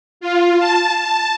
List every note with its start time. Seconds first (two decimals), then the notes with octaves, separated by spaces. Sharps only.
0.21 F4
0.58 A5
0.99 A5